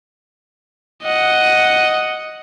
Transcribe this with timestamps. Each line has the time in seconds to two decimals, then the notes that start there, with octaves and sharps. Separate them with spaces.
1.04 D#5 F#5